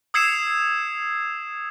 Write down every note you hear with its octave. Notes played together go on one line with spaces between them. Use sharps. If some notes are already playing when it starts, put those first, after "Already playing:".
D#6 E6 G#6 C7 C#7 E7